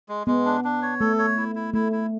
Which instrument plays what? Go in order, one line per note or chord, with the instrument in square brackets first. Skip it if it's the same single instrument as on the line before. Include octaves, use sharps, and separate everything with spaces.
[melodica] G#3
[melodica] G#3 [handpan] B3
[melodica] D4
D4
C#5
[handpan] A3 [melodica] A4
[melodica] C#5
E4
E4
[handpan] A3 [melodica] E4
[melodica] E4